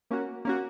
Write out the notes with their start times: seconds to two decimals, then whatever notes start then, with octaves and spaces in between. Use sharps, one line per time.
0.11 A#3 C#4 F#4
0.45 A#3 C#4 F#4